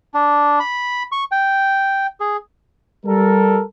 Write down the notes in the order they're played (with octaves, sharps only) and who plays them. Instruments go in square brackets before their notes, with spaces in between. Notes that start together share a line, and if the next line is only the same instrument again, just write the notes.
[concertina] D4
B5
C#6
G5
G#4
[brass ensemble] G3 A4 A#4